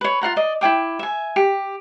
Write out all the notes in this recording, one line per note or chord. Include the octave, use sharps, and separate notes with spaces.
B4 C#5
F4 F5 F#5 A#5
D5 D#5
E4 C#5 G5 D6
E5 G#5
G4